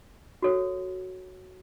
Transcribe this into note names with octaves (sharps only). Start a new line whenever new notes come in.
F#4 A4 C#5